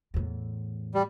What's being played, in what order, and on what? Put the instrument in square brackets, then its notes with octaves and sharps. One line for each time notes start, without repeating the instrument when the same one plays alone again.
[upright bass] E2 A2
[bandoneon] G3